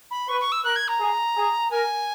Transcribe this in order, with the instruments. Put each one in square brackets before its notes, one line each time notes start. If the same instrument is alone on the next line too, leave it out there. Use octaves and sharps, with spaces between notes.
[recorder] B5
[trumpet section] B4 [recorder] C#6
[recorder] C#6
E6
[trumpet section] A#4 [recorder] F#6
[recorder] G#6
A#5
[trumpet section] G#4
G#4
[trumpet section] A#4 [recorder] G#5